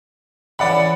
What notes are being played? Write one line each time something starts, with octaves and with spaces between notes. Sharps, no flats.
C#3 E3 D5 F#5 B5